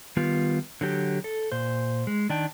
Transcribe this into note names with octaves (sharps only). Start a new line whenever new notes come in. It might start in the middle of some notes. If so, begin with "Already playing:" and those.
D#3 G3 B3 F4
D3 F#3 G4
A4
A#2 C5
G#3
D#3 D4 G5